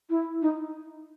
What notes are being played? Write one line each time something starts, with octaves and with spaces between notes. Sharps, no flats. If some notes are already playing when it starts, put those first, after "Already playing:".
E4
D#4